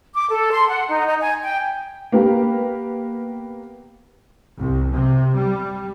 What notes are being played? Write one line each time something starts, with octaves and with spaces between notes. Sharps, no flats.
D6
A4
C6
F#5
D#4
D#4
G#5
G5
A#3 B3 G4
C2
C3
G3